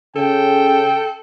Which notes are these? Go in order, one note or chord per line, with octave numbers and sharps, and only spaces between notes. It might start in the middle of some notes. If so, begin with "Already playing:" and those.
C#3 A4 G5